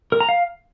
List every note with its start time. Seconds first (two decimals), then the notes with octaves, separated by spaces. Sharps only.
0.12 A#4
0.20 A#5
0.29 F5